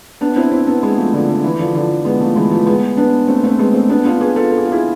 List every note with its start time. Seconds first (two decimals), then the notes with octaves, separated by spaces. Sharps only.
0.21 B3 D4
0.36 C4 E4
0.52 C4 E4
0.67 B3 D4
0.83 G#3 B3
0.98 F3 A3
1.13 D3 F3
1.29 D3
1.44 E3
1.59 D3 F3
1.75 D3 F3
2.05 G#3 B3
2.21 F3 A3
2.36 E3 G#3
2.51 F3 A3
2.66 G#3 B3
2.97 B3 D4
3.28 A3 C4
3.43 A3 C4
3.59 G#3 B3
3.74 A3 C4
3.89 B3 D4
4.05 D4 F4
4.20 G#4 B4
4.36 F4 A4
4.51 A4
4.58 G#4
4.65 F4
4.72 E4 G#4